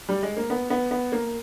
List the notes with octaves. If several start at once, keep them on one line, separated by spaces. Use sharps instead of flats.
G3
G#3
A#3
B3
B3
B3
A#3